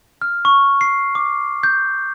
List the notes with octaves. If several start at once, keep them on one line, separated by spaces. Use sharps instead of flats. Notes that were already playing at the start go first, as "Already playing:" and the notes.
F6
C#6
C7
D6
G6